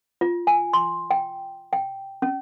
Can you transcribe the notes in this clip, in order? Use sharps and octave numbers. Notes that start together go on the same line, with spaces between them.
F4
G#5
C6
G5
G5
C#4